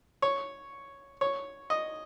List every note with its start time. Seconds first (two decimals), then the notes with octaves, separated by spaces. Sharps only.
0.22 C#5
1.21 C#5
1.70 D#5